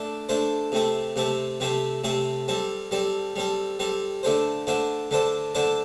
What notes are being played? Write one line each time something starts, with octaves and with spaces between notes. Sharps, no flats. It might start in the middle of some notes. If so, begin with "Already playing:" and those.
Already playing: A3 D4 A4
A3 D4 A4 C5
C3 A3 C4 A4
C3 A3 C4 A4
C3 A3 C4 A4
C3 A3 C4 A4
G3 C4 A4
G3 C4 A4
G3 C4 A4
G3 C4 A4
D3 A3 D4 A4 C5
D3 A3 D4 A4 C5
D3 A3 D4 A4 C5
D3 A3 D4 A4 C5